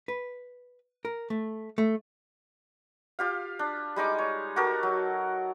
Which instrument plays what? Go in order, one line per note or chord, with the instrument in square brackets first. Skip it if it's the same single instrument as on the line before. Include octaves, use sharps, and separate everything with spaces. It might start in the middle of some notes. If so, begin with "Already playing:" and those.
[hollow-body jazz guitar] B4
A#4
A3
A3
[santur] F4 G4 F5
D4
G3 G#3 D#4 D6
C#5
F#4 G4 A4 A#4
F#3